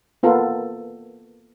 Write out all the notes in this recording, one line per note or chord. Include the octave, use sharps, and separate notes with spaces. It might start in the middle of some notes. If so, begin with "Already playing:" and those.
A#3 B3 F4 A4 A#4